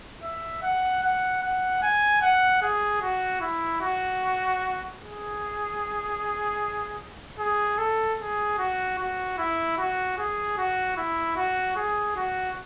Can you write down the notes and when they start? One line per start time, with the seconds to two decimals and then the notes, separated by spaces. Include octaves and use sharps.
0.23 E5
0.62 F#5
1.03 F#5
1.43 F#5
1.82 G#5
2.22 F#5
2.62 G#4
3.01 F#4
3.41 E4
3.81 F#4
5.00 G#4
7.39 G#4
7.78 A4
8.19 G#4
8.58 F#4
8.98 F#4
9.38 E4
9.78 F#4
10.18 G#4
10.58 F#4
10.97 E4
11.36 F#4
11.76 G#4
12.16 F#4